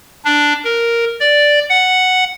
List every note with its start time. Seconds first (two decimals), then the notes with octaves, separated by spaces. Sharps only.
0.25 D4
0.64 A#4
1.20 D5
1.70 F#5